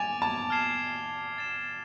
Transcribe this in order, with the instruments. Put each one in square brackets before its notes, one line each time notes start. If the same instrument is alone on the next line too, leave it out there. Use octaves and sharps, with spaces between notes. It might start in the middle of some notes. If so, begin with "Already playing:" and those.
Already playing: [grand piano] G#5 [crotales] D6 A6 D7 F7
[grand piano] A5
[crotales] F6 G#6 C7 E7
A6 E7